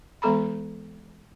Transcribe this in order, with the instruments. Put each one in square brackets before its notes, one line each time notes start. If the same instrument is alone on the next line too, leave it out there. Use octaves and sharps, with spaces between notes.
[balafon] E3 G#3 B3 A4 A#5 B5